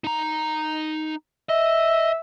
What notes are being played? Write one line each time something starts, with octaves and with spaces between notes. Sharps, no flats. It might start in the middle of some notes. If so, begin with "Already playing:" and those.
D#4 A#5
D#5 E5